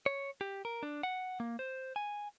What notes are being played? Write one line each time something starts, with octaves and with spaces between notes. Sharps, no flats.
C#5
G4
A#4
D4
F#5
A#3
C5
G#5